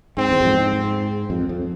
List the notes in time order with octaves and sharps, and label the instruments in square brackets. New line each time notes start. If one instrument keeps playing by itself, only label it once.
[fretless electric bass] G#2 [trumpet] C4
[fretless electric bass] E2
F2
G#2
G#2
F2
F2